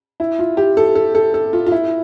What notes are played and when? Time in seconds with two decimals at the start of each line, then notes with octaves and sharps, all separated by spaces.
0.20 E4
0.39 F4
0.57 G4
0.77 A4
0.95 A4
1.15 A4
1.34 A4
1.53 F4
1.66 F4
1.72 E4